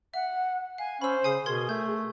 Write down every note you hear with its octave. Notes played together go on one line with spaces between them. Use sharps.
E5 F#5
F5 G#5
C#4 C5 B5 E6
C#3 G#5 D#6 C7
B2 G#4 A#4 C6 G#6
A3 G6